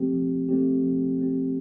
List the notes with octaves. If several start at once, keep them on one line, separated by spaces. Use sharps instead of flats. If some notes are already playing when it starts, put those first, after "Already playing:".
Already playing: F3 A3 C4 G4
F3
A3 C4 G4
F3
A3 C4 G4